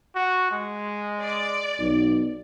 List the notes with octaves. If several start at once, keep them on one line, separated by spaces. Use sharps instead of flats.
F#4
G#3
D5
B1